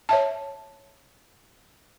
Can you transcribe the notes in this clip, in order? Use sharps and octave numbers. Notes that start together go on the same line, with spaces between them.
C#5 E5 A5